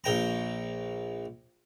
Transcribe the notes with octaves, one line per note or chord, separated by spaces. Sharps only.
A#1 G5 A#5